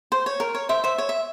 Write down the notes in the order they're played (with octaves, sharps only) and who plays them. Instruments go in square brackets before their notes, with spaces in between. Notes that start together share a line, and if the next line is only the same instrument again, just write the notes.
[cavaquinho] C5
C#5
A#4
C#5
C5 E5
C5 E5
C#5
E5